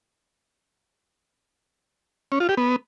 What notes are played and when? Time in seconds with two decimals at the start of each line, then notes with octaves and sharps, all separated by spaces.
2.32 C#4
2.40 F4
2.49 G4
2.57 B3